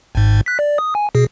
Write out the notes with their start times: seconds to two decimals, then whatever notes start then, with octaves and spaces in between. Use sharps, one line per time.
0.15 G#1 G#2
0.46 F#6 B6
0.59 D5
0.78 D#6
0.95 G#5
1.15 B2 G#4